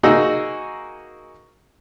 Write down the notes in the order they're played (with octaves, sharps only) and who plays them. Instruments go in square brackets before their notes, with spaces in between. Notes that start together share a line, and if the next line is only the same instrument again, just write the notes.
[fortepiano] A#3 D#4 F#4 G#4 D#5 E6